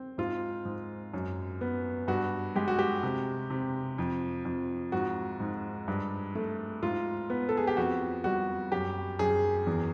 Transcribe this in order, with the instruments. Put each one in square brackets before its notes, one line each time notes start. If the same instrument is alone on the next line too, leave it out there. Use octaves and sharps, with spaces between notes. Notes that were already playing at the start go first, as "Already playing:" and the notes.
Already playing: [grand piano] C4
G#2 F4
G#2
F#2
B3
G2 F#4
G#3 G4
F#4
G4
C3
C3
F2
F2
G#2 F#4
G#2
G2
A3
G#2 F4
B3
A4
G#4
G4
F2 F#4
G3 F#4
F#2 G4
F#2 G#4
E2